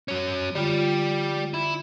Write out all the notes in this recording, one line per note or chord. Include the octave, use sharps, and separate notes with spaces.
F#3 C#4
D3 G3 F4 G4
E4